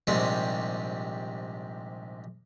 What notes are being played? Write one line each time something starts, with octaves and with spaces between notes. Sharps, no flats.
A#1 G#2 C3 G3 C4